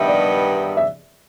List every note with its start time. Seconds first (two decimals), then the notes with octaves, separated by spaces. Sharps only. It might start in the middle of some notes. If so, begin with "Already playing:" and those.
Already playing: G2 D#3 G3 B3 D#4 E5
0.08 D5
0.77 E5